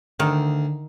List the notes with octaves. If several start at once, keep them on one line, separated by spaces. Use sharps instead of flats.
D2 D#3